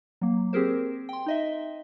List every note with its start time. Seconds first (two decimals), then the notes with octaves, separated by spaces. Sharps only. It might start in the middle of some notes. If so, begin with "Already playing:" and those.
0.21 F#3 A#3
0.53 C4 G4 G#4 A#4 C5
1.09 G5 C6
1.26 D#4 D#5 E5